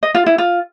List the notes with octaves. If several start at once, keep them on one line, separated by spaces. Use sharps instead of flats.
D#5
F4
E4
F4